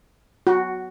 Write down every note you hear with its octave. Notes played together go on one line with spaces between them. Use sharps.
F#4